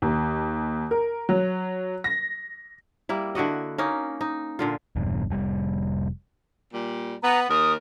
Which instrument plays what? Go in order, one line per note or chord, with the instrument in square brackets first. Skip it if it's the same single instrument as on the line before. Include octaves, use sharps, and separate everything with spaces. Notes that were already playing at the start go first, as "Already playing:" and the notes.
[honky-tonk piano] D#2
A#4
F#3
A#6
[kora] G3 A#3 E4
D3 E4 F#4 D#5
A#3 C#4 D#4
D#4
A#2 D3 F4
[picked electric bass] E1 E2 G2
F1 G3
[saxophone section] A#2 G3
[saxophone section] B3 [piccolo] A#5
[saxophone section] D#2 A#4 [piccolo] D#6